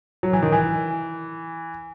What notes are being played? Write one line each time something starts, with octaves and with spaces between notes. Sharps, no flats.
F#3
E3
D#3
E3